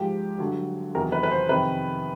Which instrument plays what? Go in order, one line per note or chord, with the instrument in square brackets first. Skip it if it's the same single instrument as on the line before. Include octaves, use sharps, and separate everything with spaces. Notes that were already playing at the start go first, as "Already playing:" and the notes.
Already playing: [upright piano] G#2 F3 G4
G2 D3 F#3
E2 C3 D#3 F#3 A#4
B4
B4
C5
F2 C3 D#3 B4